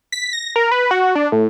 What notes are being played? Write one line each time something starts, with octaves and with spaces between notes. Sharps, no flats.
B6
A#6
A#4
B4
F#4
D4
A2